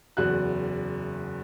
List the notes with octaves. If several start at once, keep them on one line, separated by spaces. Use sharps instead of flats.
F#1 E2 F#4 F#6